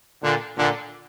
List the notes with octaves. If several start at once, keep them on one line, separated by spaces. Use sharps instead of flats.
A#2 D3
A#2 D3